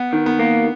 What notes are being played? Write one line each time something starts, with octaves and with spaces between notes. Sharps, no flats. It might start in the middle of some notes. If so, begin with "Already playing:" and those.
Already playing: B3
D#3
B3
A#3